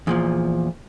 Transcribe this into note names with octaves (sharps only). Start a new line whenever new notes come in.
E2 A#2 F3